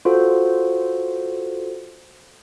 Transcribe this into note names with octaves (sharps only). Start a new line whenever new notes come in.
F4 F#4 A4 C5